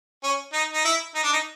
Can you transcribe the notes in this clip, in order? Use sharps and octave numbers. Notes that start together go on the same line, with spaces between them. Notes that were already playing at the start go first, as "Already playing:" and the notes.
C#4
D#4
D#4
E4
D#4
D4
D#4